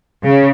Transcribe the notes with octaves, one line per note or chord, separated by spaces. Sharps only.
C#3